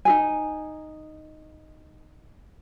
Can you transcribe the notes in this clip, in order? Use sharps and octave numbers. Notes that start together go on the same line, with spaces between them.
D#4 G#4 G#5